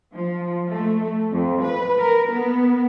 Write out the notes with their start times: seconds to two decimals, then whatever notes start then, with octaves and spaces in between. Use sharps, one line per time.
0.15 F3
0.71 A3
1.32 F2
1.62 B4
1.99 A#4
2.32 B3